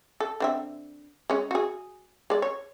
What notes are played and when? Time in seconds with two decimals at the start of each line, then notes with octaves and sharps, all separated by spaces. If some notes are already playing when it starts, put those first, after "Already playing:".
0.20 A4
0.40 D3 C4 E5
1.30 G#3 C#4
1.51 F#4 G#4
2.30 G#3 D5
2.42 C#5